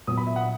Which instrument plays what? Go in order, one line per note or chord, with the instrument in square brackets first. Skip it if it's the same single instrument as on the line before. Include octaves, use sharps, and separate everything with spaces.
[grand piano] A#2 F#3 B3 D#6
B5
E5
F#5